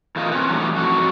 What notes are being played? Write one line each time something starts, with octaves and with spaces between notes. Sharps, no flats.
A2 E3 A#3 C4 F4 D#5
C4 C#4 B4
E3 F#3 G3 A3 D#4
F2 F#3 F#4